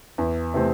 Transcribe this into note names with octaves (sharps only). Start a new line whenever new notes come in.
E2
C3 E3 A3 C4